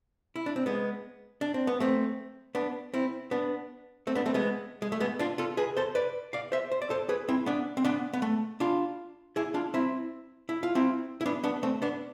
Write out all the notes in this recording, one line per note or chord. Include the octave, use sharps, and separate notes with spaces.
E4
D4
C4
G#3 B3
D4
C4
B3
A3 C4
B3 D4
C4 E4
B3 D4
A3 C4
B3 D4
A3 C4
G#3 B3
G#3
A3
G#3 B3
D4 F4
F4 A4
G#4 B4
A4 C5
B4 D5
D5 F5
C5 E5
C5
D5
A4 C5
G#4 B4
C4 E4
B3 D4
C4
B3 D4
B3
A3
D4 F4
E4 G#4
D4 F4
C4 E4
E4
F4
C4 E4
E4
B3 D4
B3 D4
A3 C4
B3 D4